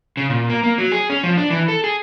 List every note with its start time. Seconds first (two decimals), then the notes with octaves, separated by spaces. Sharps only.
0.17 C#3
0.30 A#2
0.50 A#3
0.63 A#3
0.78 F#3
0.92 G#4
1.10 C#4
1.23 F3
1.37 D4
1.50 E3
1.68 A4
1.84 G#4